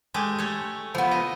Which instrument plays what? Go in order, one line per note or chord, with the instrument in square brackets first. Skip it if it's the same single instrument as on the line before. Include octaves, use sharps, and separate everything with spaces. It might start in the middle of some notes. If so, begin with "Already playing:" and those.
[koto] G#3 A3 G4
A3 C#5
[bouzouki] F3 B3 [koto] A3
[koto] D#5